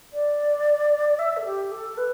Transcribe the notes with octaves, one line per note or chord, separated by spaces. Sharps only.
D5
E5
A4
G4
A4
B4